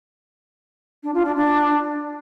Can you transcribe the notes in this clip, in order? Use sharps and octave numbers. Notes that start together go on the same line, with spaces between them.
D4
F4
D4
D4